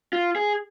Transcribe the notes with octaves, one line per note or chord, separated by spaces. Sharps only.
F4
G#4